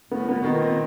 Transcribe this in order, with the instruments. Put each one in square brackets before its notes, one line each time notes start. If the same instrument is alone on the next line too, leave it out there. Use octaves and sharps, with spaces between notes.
[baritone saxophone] A2 [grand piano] B3
[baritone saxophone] A#2 [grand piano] B3
[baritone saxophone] B2 [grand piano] D#3
[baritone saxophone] A#2
[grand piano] C4